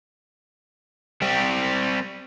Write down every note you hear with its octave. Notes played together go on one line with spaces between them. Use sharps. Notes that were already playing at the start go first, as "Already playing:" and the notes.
G3 C4